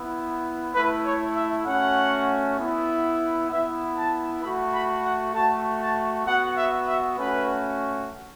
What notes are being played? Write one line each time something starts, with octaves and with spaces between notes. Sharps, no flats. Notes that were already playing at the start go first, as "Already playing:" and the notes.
Already playing: B3 E4
A3 E4 B4
C#5
E5
A3 C#4 F#4 F#5
B3 E4
B3 E4 E5
A5
A3 F#4 B5
B5
F#5
A3 F#4 A5
A5
B3 F#4 F#5
E5
E5
A3 C#4 F#4 B4